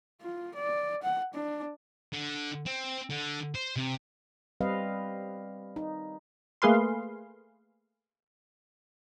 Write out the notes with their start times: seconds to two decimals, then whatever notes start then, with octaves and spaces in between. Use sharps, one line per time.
0.22 F4
0.55 D5
1.03 F#5
1.34 D4
2.13 D3
2.67 C4
3.10 D3
3.55 C5
3.76 C3
4.61 G3 C4 B4 D#5 F5
5.76 D#4
6.62 A3 A#3 G#4 B4 F5 C6